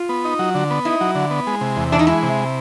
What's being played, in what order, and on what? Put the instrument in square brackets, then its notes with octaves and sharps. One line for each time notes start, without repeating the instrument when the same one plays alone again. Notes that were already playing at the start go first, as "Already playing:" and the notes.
Already playing: [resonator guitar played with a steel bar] F4
[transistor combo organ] B3
D#4
F#3
D3
B3
[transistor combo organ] D#4 [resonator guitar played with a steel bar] E4
[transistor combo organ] F#3
D3
B3
G#3
C3
E2
[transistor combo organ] E3 [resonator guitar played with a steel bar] D4
[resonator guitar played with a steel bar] D#4
[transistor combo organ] G#3 [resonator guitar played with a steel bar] E4
[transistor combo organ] C3